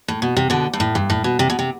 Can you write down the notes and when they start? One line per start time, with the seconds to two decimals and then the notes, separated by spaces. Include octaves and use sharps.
0.08 A2
0.22 B2
0.37 C3
0.50 B2 D3
0.73 G2
0.80 A2
0.95 G2
1.10 A2
1.24 B2
1.39 C3
1.50 B2
1.59 C3